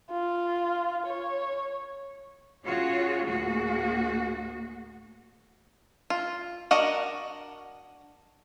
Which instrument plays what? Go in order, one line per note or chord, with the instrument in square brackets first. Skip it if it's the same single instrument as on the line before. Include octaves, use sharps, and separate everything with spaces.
[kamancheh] F4
C#5
[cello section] C#4 F4 F#4 G#4 C#5
D2 A2 A#3 F#4 G#4
[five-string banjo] F4
D4 F#4 A#4 D#5 F#5